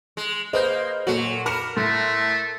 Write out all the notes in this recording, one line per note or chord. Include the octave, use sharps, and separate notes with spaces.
G#3
A#3 G#4 B4 C5 D#5 G6
A#2 F#3 F#4 A4 F#7
A#4 B5 D6 C#7 E7
A2 A3 C6 F#6 A#6